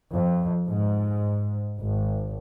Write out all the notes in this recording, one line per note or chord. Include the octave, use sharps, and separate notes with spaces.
F2
G#2
G#1